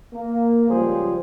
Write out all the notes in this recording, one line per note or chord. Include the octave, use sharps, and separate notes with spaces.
A#3
C#2 F3 G3 G#4 C5